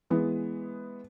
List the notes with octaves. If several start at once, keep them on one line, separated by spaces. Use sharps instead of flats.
E3 G#3 B3